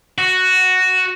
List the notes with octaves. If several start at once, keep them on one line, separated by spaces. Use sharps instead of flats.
F#4